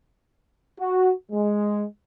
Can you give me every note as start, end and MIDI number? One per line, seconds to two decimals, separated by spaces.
0.79 1.11 66
1.31 1.83 56